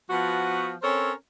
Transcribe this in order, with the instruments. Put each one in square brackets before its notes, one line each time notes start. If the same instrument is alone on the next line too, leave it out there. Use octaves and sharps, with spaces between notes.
[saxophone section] F3 B3 F#4
C4 C#4 A4 A#4 C5 C#5